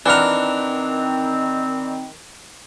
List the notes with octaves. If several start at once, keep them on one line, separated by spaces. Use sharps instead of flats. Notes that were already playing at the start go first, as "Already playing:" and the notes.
D#3 E3 C4 D4 F#5 A#5 F6